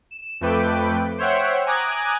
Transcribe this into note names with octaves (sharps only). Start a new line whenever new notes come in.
E7
F2 A3 B4 G5 D6
C5 C#5 E5 F#5 G5
G#5 A#5 D6 D#6 F#6 G#6